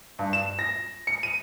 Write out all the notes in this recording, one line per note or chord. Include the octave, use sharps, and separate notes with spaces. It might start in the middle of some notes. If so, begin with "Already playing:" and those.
G2
E7
A#6
C#7
D#7